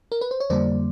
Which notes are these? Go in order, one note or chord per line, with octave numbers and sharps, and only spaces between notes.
A#4
B4
C5
C#5
F2 D3 G3 A#3 C5 D5